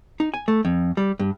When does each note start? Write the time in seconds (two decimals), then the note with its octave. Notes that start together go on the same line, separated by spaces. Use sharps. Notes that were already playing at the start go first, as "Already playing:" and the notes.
0.20 D#4
0.34 G#5
0.48 A3
0.65 F2
0.97 G3
1.19 G2